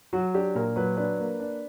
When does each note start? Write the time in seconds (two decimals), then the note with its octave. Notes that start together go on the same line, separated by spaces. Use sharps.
0.13 F#3 F#4
0.34 D4 G4
0.55 A#2 A#4
0.76 F#3 B4
0.97 D4 B4
1.19 A#3
1.40 D4